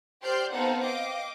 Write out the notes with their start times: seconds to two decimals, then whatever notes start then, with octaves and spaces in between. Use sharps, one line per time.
0.22 G4 C5 D5 C6 F6 G6
0.53 B3 C4 D#4 A4 F5 F#5
0.82 D#5 F5 G5 D6